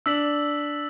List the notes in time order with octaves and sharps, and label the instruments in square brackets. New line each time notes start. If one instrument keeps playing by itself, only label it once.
[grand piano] D4 [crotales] E6 B6 F#7